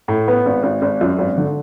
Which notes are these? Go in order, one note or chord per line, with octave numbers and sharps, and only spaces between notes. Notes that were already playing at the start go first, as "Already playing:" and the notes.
A2
B3
G#1
G#1
G#1
F#2
G#1
D3